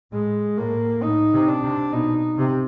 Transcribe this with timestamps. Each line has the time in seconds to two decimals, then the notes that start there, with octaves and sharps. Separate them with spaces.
0.13 A2 G#3
0.58 A2 A#3
1.03 A2 D#4
1.33 C3
1.48 D4
1.63 C3
1.93 B2 D#4
2.38 C3